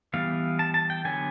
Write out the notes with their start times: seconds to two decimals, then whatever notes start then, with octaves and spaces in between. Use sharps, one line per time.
0.14 E3 G3 B3 F5
0.59 A5
0.74 A5
0.90 G5
1.05 D3 F#3 B3 G#5